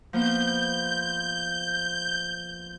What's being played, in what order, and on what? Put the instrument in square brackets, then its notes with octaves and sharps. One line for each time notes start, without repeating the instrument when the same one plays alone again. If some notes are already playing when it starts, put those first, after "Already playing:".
[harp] F3 A#3 B3 [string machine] G6